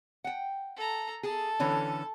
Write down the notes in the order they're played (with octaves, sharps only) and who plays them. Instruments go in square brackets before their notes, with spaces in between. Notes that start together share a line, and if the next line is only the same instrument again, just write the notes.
[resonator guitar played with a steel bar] F#5 G5
[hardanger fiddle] A4 A#5
[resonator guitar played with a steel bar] G#4 [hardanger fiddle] A4 A5
[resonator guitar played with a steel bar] D3 E3 C#4